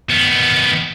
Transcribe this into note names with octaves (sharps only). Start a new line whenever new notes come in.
D#3 B3